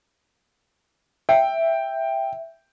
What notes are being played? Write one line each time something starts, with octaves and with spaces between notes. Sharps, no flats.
E5 G5